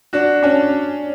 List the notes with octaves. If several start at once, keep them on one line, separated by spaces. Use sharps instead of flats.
D4 F#4
C#4 D4